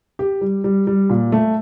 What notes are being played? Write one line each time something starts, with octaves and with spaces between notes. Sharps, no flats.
G4
G3
G3
G3
A#2
A3